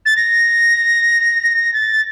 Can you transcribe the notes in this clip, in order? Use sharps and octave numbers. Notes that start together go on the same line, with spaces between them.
A6
A#6
A6